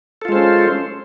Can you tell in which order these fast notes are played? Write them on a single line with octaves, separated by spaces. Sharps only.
A4 F4 G#3 C5 C#4